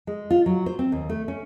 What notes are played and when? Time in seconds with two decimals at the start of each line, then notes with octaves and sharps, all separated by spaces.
0.07 G#3
0.30 F4
0.46 F#3
0.66 C5
0.79 C4
0.92 D#2
1.09 A3
1.28 C#4